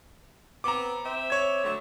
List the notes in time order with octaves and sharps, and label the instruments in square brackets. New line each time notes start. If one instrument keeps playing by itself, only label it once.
[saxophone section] B3 C4 [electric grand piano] A#5 D6
[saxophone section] C4 E5
[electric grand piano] C#5 G#6
[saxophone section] D3 F#3 A3